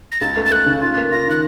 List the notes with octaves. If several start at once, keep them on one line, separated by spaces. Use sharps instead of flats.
A#6
C#2 A6
A3
A6
A3 F#6
C#3
F4 A6
A#3
F4 A#6
D#3 F#6